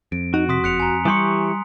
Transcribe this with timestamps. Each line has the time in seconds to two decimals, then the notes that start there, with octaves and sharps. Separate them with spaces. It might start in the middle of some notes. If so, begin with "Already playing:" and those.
0.12 F2 D7
0.34 D#4 F#4
0.49 C3 C6 D#6 B6
0.64 F#1 F#6 C#7 F7
0.80 G#5 A#5
1.05 E3 G3 G4 C6 C#6 D#6